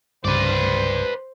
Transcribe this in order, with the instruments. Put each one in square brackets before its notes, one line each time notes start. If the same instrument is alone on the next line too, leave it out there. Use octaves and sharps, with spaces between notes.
[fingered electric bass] C2 G2 C#3 [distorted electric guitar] B4 D5 [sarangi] C5